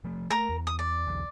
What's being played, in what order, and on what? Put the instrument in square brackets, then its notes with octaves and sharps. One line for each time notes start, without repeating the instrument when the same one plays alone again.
[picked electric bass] F3 A3
[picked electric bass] A3 [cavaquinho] A#4 A#5
[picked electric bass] E2
[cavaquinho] D#6
D5
[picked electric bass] B1 E2